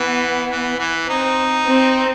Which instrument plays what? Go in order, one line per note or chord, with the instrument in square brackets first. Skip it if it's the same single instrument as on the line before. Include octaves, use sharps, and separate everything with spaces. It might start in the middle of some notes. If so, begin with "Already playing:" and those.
Already playing: [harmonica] E3 [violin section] B3
[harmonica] E3
E3
[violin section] C4 [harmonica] D#4
[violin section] C4